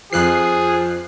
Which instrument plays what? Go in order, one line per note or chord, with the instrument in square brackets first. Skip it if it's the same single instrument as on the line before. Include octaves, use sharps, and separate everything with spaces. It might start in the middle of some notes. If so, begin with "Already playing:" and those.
[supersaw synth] F2 F#6 C7 [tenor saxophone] F3 [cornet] G#4